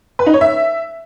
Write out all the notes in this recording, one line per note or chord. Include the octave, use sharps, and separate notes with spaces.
B4
D#4
C#5
E5